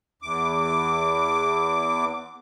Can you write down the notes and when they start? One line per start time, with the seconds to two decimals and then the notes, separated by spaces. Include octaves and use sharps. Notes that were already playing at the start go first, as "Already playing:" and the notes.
0.22 E2 D6